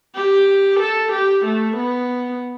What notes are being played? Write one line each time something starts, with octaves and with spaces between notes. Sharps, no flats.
G4
A4
G4
A3
B3